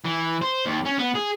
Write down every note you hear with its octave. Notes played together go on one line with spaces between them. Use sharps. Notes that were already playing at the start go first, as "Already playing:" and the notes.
E3
C5
D#2
C#4
B3
G#4